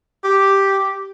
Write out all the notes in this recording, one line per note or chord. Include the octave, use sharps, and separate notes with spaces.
G4